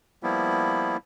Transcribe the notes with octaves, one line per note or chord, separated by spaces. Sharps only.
F3 G3 A#3 B3 E4